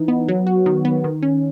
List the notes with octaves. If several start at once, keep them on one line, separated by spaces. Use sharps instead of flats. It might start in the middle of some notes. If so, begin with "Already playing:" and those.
Already playing: E3 D#4
B3
F#3
F#4
D#3
B3
D#3
C#4